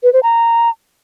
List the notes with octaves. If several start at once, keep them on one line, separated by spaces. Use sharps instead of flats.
B4
C5
A#5